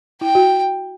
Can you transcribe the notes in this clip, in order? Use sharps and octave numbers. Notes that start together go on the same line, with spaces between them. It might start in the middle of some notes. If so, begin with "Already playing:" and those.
E4 G5
F#4